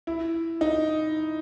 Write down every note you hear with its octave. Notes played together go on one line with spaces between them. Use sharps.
E4
D#4